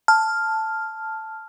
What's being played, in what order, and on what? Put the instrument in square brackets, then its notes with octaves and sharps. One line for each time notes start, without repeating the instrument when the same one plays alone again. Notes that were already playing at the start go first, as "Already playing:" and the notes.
[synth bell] A5 F6